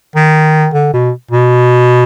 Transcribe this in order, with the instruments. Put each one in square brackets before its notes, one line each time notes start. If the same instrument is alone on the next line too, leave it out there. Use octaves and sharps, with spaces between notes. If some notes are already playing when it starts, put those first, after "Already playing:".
[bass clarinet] D#3
D3
B2
B2